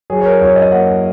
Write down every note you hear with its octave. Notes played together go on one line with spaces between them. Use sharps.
F#3 G#4
C#5
A#4
F#2 C#5
D#5
A#3 F#5